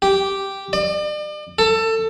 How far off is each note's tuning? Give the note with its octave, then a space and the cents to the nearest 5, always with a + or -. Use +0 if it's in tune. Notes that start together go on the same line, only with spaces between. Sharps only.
G4 -5
D5 +40
A4 +20